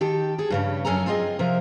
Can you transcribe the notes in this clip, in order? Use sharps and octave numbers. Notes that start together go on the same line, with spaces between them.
D#3 G4 A4
G#4 A4
G2 C#3 C#4
F#2 C#4 A4 G#5 A#5
C4 F4 G#4 D#5
C3 F3 A#4